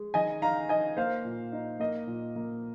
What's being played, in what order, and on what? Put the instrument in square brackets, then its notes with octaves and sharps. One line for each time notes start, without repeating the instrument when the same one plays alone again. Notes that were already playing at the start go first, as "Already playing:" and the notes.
Already playing: [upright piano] G#3
D#3 D#5 G#5
D#4 F5 A#5
D#4 D#5 G#5
A#3 C5 F5
A#2
D#4
A#3 D#5
A#2
A#3